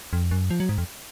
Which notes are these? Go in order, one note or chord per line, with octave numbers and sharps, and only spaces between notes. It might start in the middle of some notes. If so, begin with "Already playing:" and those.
F2
F#2
F3
F#3
G#2
F2